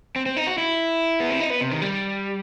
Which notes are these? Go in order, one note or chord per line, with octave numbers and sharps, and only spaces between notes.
C4
C4
D#4
F#4
E4
B3
C4
D#4
B3
C3
D#3
G3